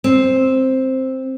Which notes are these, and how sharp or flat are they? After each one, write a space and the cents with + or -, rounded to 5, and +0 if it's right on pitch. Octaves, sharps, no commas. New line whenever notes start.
C4 +5